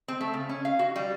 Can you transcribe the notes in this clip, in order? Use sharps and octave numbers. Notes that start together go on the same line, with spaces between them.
C4
A3
C#3
C#4
F5
F#4
G3